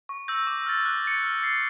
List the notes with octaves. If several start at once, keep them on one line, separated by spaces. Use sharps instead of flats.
C#6
E6 G6 A#6
D6
F6 A6
F#6
A6 C#7
F6
A6 C7